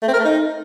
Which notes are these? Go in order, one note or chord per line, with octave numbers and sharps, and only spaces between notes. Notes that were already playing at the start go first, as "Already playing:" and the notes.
A3
C4
A#4
A3
D#4